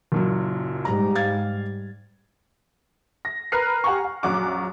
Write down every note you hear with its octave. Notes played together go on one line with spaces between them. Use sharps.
F#1 A#2 F#3
G#2 G3 A#5
F5 G#6 A6
A#6
A#4 B4 F6 C7
G4 F#5 G#5 A#5 C#6
F#5
A#1 F#2 F#4 C#6 D6 F#6